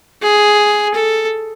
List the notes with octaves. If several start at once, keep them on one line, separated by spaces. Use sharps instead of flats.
G#4
A4